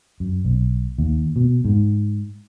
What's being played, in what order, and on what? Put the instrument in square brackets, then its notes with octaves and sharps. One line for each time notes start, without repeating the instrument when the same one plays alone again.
[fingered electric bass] F#2
B1
D#2
B2
G#2